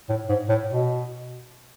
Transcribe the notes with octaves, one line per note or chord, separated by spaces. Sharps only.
A2
G#2
A2
B2